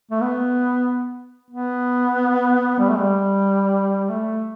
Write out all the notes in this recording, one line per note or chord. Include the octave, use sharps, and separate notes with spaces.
A3
B3
B3
G3
A3
G3
A3